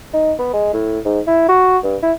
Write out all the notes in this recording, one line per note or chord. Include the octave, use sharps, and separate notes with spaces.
D#4
B3
G#3
A2
G#2
E4
F#4
G2
E4